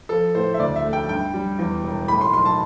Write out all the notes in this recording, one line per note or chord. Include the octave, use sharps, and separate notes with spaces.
F3 A4
A2 C5
E5
D2 D5
E5
A3
G5
G2 G5
G3
E2
E1
A2 B5
C6
B1 C6
A5